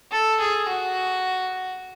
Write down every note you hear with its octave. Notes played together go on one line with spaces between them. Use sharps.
A4
G#4
F#4